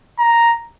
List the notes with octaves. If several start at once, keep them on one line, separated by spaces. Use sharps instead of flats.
A#5